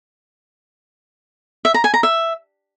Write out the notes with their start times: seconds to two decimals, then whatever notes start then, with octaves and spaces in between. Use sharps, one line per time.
1.65 E5
1.74 A#5
1.84 G#5
1.94 A#5
2.03 E5